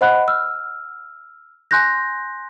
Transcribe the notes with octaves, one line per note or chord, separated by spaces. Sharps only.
C5 D#5 F#5 B5 F#6
E6 F6
G#5 C6 F#6 G6 A#6